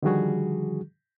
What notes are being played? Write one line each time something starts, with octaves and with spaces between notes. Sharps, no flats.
D3 D#3 F3 G3 F#4 G#4